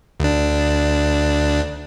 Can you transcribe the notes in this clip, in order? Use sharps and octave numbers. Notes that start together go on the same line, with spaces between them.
D2 D4